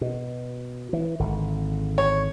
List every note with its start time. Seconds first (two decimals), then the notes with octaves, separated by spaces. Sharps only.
0.01 B2
0.93 E3
1.20 G#1 D3
1.98 C#5